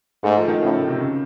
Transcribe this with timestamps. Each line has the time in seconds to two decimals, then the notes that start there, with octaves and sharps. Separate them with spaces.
0.23 G#2 A3
0.37 F3
0.48 D#3
0.62 A2 C#3
0.87 C3
1.00 C#3